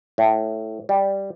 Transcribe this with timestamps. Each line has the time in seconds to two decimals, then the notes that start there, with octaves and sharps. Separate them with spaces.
0.18 A2
0.89 G3